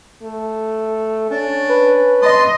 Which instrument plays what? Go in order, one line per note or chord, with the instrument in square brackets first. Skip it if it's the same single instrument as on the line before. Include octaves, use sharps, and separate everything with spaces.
[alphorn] A3
[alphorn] C#4 [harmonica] D4
[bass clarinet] B4
[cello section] D#5 [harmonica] A5 C6